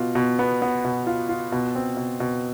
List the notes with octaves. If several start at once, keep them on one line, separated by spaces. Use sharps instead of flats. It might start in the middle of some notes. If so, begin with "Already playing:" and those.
Already playing: B2 F4
B2
B3
B3
B2
F4
F4
B2
C4
B2
B2